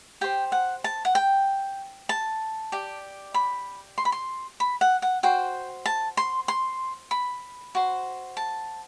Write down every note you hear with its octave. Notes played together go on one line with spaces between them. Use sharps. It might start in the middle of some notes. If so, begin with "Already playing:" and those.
G4 C5 G5
F#5
A5
F#5
G5
A5
G4 D5
B5
C6
B5
C6
B5
F#5
F#5
F#4 C5 G5
A5
C6
C6
B5
F#4 C5
A5